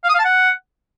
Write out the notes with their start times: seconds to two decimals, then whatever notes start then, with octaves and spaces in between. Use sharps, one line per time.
0.04 F5
0.09 D#6
0.14 F5
0.19 A5
0.24 F#5